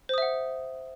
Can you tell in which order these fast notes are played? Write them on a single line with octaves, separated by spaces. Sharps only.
C5 D#6 E5 F#5